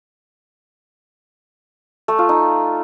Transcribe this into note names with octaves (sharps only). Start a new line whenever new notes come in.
A3
F4
D#4